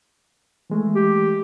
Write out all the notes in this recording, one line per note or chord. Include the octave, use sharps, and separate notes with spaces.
E3 G#3 A3
G4